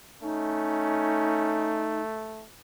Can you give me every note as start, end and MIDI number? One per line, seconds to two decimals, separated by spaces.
0.22 2.45 57
0.22 1.89 61
0.22 2.02 63